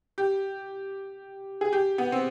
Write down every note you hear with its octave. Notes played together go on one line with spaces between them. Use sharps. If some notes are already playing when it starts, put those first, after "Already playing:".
G4
G#4
G4
B3
C4